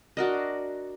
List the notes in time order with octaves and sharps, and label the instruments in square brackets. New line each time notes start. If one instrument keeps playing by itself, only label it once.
[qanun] D4 F#4 A#4 D#5